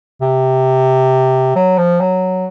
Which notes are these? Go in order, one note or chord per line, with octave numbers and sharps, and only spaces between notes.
C3
F#3
F3
F#3